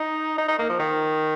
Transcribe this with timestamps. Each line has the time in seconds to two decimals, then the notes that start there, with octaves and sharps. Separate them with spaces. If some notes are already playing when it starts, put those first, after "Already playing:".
Already playing: D#4
0.38 D#4
0.48 D#4
0.59 A#3
0.69 F3
0.79 D#3